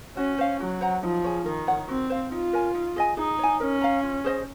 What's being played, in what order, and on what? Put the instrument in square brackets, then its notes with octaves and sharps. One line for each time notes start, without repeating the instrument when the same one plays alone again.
[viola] C#4 [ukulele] F#4
[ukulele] C5 F5
[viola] F#3 [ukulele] F#4
[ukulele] C5 F#5 A#5
[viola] F3 [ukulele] D#4
[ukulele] G#4 C#5
[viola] D#3 [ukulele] A#4
[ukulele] C#5 F#5
[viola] C4 [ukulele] F#4
[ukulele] C5 F5
[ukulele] D#4 [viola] F4
[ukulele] A#4 C#5 G#5
D#4
G#4 D#5 G#5
[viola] D#4 [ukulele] G#4
[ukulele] C#5 G#5
[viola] C#4 [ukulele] A#4
[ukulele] F5 A#5
F4
G#4 C5 D#5